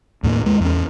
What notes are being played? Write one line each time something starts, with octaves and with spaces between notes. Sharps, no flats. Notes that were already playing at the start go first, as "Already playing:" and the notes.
D#2 A2 A3 A#3
D#2 G#3
E2 C#4